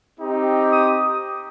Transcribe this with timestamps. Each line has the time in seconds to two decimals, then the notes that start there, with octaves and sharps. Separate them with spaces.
0.19 C4 D#4 G4
0.72 D#6